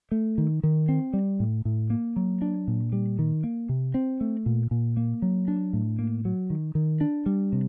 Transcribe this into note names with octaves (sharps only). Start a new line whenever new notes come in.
A3
D#3
D#3
C4
G3
A2
A2
A#3
F#3
D4
A#2
G3
D#3
A#3
C3
C4
A3
A#2
A#2
A#3
F#3
D4
A2
A#3
F#3
D#3
D#3
D4
G3
C3